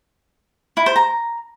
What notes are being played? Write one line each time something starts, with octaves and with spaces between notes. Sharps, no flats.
E4
C5
A#5